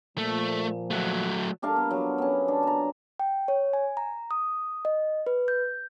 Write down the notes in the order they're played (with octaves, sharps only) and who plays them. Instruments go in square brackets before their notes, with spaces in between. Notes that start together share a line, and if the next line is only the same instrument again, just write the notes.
[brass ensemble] A#2 F3 [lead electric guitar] A3
[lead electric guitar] F#3 A3
[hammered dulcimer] G3 D4 A#4 F5
B3
F#3
B3 C#4
D4
A5 A#5
[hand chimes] G5
C#5
G#5
A#5
D#6
D#5
B4
G6